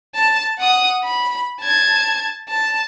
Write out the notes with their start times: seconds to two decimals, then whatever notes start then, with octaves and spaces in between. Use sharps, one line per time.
0.15 A5
0.59 F#5 D#6
1.04 B5
1.61 A5 G#6
2.49 A5